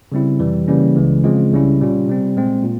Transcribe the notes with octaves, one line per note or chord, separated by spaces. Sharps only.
C#3 G3 C4 E4
F2 C3 E3 G3
C#3 E3 G3 A#3 C#4
C#2 C#3 E3 G#3
C#3 F3 G#3 C4 F4
C#2 C#3 G3 C#4 E4
A#2 G3 C#4 F4
C3 G3 C4
A#2 G#3 C4
A#2